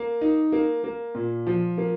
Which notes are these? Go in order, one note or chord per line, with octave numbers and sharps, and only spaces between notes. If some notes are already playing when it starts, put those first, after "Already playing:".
Already playing: A#3
D#4
A#3
A#3
A#2
F3
A#3